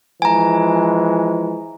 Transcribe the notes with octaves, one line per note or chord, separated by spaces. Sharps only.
E3 F3 G#3 G#5 A#5